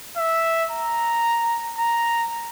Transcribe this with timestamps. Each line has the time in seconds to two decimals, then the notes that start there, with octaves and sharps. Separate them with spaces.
0.17 E5
0.71 A#5
1.79 A#5